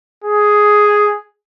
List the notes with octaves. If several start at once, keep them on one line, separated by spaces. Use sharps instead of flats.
G#4